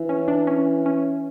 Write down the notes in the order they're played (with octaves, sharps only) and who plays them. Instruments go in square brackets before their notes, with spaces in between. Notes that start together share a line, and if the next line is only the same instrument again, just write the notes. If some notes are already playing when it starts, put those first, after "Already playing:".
Already playing: [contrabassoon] E3
[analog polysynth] C#4
D4
C#4
C#4